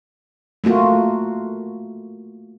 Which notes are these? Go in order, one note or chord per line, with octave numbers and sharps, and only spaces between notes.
A3 A#3 F4 F#4